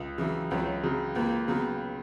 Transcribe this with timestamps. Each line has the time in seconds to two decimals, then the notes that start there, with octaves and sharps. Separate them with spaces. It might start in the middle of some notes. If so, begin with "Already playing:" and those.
Already playing: C#2
0.18 C#3 E3 F#3
0.51 C#2 F#3
0.83 C#3 F#3
1.15 C#2 A#3
1.48 C#3 F#3 B3